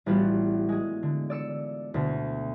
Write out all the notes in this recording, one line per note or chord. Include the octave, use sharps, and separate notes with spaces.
A1 G3 B3 F4 F#4
G#3 G#4
D3
D5 E6 C#7 E7
D2 B2